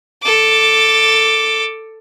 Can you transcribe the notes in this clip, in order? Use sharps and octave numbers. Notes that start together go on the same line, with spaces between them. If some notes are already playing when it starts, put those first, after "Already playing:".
A4 D6